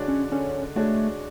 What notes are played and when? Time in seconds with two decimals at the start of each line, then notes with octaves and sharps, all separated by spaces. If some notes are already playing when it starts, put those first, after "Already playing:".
Already playing: D3 G#3 D4 F#4 C#5
0.08 C#4
0.31 D3 C#4
0.76 G#3 A3 D4 F#4 C#5